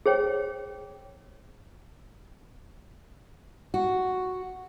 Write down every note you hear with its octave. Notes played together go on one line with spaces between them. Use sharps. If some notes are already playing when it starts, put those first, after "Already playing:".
G#4 C5 C#5 G5
F#4